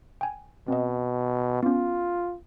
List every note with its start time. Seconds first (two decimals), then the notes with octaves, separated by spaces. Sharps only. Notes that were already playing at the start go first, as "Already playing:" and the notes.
0.21 G5 G#5
0.68 B2 C4 D#5
1.63 B3 C#4 F4